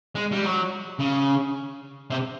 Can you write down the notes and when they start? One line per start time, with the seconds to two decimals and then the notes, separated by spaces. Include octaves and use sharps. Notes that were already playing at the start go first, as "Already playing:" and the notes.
0.15 G#3
0.32 G3
0.43 F#3
0.99 C#3
2.10 C3